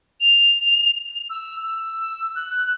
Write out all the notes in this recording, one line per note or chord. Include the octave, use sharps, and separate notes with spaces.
F7
E6
E6
F#6